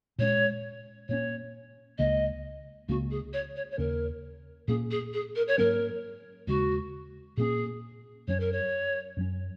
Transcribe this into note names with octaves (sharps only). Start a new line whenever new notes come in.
A#2 G#3 C#4 C#5
A#2 A#3 C#4 C#5
C#2 C#3 A#3 D#5
C#2 C#3 A#3 C#4 F#4
G#4
C#5
C#5
C#5
D#2 C#3 A#3 C#4 A#4
A#2 A#3 C#4 G#4
G#4
G#4
A#4
C#5
G#2 F#3 A#3 C#4 A#4
D#2 C#3 G#3 C#4 F#4
A#2 A#3 C#4 G#4
F#2 F#3 C#4 C#5
A#4
C#5
F#2 F#3 C#4